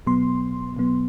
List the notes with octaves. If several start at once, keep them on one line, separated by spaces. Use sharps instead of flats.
B2 F#3 B3 C6
B2 F#3 B3